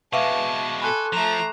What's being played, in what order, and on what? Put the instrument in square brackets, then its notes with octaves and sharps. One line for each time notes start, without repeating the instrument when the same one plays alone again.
[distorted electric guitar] B2 G#3 [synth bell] B4 E5 F5 [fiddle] A5 [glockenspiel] C#6 D6
[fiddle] A4 G#5 [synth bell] B5 [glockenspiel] C6 F#6
[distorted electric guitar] F3 [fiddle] A3 A#5 [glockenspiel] E7 F7